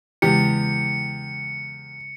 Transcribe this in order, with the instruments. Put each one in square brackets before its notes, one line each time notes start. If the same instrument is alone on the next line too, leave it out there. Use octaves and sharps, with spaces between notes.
[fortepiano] E2 G4 [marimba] C#3 G#3 [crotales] C#7